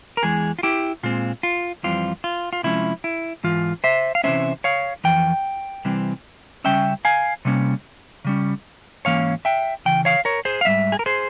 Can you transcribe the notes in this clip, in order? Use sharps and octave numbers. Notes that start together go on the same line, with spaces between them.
A#4
E2 E3 G#3 G#4
F4
E4 G4
A#2 G#3 C4 F4
F4
F2 E3 G3 C4 F4
F4
F4
C3 F3 G#3 C#4 E4
E4
G#2 E3 F4
C5 E5
F5
C3 E3 A#3 C#4 C5 E5
C#5 F5
F2 E3 G5
C3 E3 G3 C4
C#3 G3 C#4 E5 G5
F5 G#5
C3 G3 A#3 C#4
C#3 G3 C#4
G#2 E3 A#3 C#4 C#5 F5
E5 G5
C#3 E3 G5
C#5 F5
A#4 C#5
G#4 C5
F5
G#2 G3 E5
G#4
A#4
G#4 C5